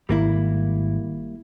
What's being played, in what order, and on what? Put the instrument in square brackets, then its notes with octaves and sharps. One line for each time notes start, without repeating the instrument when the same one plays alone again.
[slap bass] G#1 [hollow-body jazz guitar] G3 A#3 E4